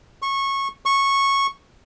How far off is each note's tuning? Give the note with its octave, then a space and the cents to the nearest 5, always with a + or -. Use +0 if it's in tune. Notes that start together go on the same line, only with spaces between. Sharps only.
C#6 -20
C#6 -10